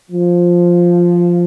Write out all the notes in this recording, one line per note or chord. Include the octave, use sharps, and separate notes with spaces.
F3